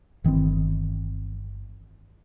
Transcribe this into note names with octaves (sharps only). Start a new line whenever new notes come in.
G1 D#3 E3 C4